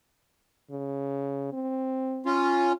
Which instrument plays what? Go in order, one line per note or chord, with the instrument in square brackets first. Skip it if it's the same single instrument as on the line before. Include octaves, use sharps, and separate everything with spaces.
[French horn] C#3
C4
[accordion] C#4 F4